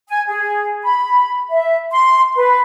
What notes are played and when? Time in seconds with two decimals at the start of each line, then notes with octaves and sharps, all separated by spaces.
0.09 G#5
0.27 G#4
0.83 B5
1.51 E5
1.92 C6
2.37 B4